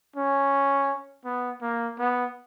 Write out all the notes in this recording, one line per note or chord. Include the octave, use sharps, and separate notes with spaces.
C#4
B3
A#3
B3